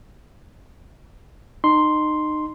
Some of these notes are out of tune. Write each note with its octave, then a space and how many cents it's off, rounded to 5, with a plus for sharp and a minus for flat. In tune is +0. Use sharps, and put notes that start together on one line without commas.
D#4 -25 C6 +0